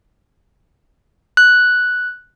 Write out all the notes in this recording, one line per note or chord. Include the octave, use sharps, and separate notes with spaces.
F#6